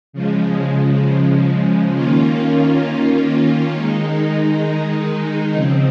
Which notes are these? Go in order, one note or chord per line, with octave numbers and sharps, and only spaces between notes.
C#3 F3 G#3
D#3 A#3 C#4 F4
D#3 G#3 D#4
C#3 F3 C4